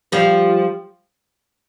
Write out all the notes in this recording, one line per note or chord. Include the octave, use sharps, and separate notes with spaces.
F3 G3